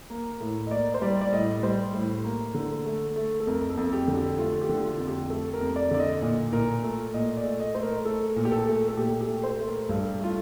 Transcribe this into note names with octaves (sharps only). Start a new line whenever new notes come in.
A#3
A2
D#5
A#3 D5
C5
G3 D5
D5
A2 D#5
G3 C5
A2
A#3
D3
A3
A3
A4
F2 A#4
A4
F2
G4
D3
G4
A3 F4
G4
D3
F4
F2
G4
A3 A4
A#4
F2
D5
D3 D5
D#5
A#2
A#2 A#4
A3 A4
A#2 D#5
D5
A3
D#5
A3 C5
A#4
A3 A4
A#2
G4
A4
A3
A4
A#2 G4
G4
A3
C5
A3
A#4
G2 A4
A3 F4